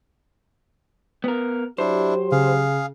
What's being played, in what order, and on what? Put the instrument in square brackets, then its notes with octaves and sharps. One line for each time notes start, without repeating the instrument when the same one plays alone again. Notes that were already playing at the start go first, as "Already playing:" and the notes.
[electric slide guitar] B3 A#4
[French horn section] F#3 G4 [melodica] D4 E4 [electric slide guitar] C5
[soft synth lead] C#3 [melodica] G#4 F5